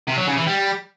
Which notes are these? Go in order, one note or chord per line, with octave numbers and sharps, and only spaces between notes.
C3
F#3
C#3
E3
G3